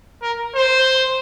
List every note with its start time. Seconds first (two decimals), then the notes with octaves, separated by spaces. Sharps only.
0.22 A#4
0.56 C5